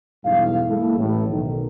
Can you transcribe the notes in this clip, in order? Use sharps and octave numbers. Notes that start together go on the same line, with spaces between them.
B1 E2 G2 E4 F5
G#3 A#3 E4 A4
A1 A2
B1 D#3